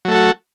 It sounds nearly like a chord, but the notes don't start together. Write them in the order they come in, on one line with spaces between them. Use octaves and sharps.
F#3 A3 A4 F#4